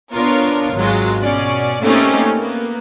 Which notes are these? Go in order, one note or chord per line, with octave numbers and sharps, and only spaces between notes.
B3 D4 F4 A#4 C#5
G#1 F#3 G#3 F4
B2 C#4 D5
A3 A#3 C4 C#4 D#4 G4
A#3 B3